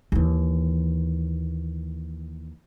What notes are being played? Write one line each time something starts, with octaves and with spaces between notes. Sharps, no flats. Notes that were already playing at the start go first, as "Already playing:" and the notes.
D#2 E3